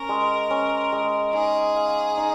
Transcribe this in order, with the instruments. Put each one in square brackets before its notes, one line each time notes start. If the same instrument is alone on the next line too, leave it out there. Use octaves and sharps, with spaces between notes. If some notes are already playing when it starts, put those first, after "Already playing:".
Already playing: [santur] C#4 [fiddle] A#4
[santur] G#3
C#4
G#3
[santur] D#4 [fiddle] G#4
[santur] F5
D#4